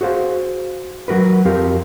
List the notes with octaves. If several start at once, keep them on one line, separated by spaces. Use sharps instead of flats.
F#4 G#4 C5 F5
F#3 F#4 A#4 B4
F2 C4 G4 A#4 F5